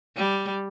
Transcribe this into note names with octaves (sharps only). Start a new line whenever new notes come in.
G3